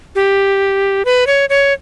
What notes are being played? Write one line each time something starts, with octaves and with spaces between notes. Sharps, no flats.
G4
B4
C#5
C#5